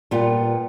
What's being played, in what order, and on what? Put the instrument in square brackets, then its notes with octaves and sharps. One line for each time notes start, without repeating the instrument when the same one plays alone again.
[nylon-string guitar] A#2 G3 B3 F4